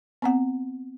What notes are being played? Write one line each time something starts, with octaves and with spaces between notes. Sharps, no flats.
B3 C4 F#5